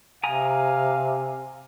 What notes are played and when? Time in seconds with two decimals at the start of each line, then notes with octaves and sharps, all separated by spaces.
0.23 C3 F5 G#5 A#5 D#6